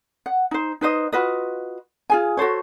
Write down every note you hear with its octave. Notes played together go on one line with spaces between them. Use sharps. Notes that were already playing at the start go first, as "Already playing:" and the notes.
F#5
D#4 C5
D#4 B4 C5 D#5
F4 F#4 B4 D#5
F4 G#4 G#5
F#4 A4 C5 C#5